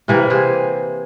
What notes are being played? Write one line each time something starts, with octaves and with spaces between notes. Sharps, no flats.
C3 E3 A#3
C3 G#4 C5